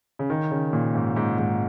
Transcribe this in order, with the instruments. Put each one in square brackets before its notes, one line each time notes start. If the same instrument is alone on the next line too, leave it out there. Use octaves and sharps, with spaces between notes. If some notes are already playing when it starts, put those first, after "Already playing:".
[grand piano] C#3
D#3
C#3
A#2
G#2
G#2
G#2